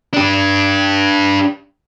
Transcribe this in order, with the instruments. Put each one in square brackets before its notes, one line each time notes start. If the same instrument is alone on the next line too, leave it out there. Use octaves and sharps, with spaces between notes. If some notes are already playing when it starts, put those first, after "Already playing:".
[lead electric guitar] D4 G4